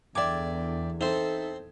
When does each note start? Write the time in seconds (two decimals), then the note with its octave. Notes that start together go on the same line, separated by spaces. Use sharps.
0.15 E2 D3 D5 E5 G5 D6 G#6
1.01 C4 D#4 A4 C5 E5